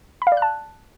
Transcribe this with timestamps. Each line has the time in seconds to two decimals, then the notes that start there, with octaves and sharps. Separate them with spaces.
0.22 B5
0.27 F5
0.32 D5
0.37 F#6
0.42 A5